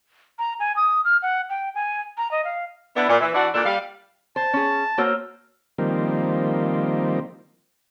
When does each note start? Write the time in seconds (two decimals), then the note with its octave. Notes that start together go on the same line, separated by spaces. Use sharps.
0.39 A#5
0.60 G#5
0.76 D#6
1.05 F6
1.22 F#5
1.50 G5
1.75 G#5
2.18 A#5
2.31 D#5
2.44 F5
2.96 B3 D4 E4
3.09 A#2
3.21 E3
3.34 E3 D4 F#4 D5 E5 F#5
3.53 A#2 D4 A4
3.65 G3 F5
4.36 C5 A5
4.53 C#4 G#4
4.98 A#3 F#4 C5 C#5 E6 F6
5.78 D#3 F3 G3 A#3 C4